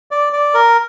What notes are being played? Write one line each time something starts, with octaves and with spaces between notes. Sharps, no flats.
D5
D5
A#4